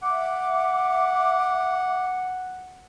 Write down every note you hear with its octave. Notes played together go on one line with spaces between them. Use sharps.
E5 F#5 D6